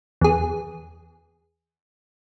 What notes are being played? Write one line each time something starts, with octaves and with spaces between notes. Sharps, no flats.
E2 G#4